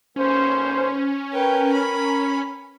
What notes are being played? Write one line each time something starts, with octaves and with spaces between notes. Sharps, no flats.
B1 A#3 C#4 C5
A#4 B4 G5
B5